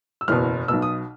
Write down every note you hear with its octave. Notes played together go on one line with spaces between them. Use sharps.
E6
F#1 E2 B2 F6
B1 B2 E6
D#6